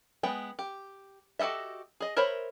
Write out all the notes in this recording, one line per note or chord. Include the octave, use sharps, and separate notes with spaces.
G#3 B3 G5
G4
F#4 G4 A4 D#5 E5
G#4 D#5
A#4 C5 C#5 E5 B5